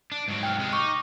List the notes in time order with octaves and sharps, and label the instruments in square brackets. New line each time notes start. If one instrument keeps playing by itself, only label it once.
[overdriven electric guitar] D4
G#2 F#3
[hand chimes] G5 F6
[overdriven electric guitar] C3 G#3
[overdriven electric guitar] D#4 [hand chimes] C#6 D6